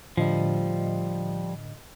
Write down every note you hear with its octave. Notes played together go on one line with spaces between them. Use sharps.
A2 D3 F3 G3 D#5